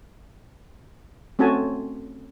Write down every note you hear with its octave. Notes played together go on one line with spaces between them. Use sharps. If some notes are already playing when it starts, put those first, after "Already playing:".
A3 C4 C#4 F#4 G#5 A5